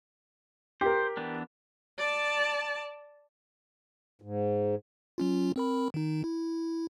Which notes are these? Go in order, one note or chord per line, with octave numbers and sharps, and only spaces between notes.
G4 A#4 C5
E3 B3 D4
D5 A5
G#2
F#3 C#4 F4
C4 A#4 B5
D#3 D#4
E4